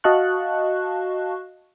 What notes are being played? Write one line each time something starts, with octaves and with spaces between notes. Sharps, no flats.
F#4 D#5 F5 A5 C#6 F#6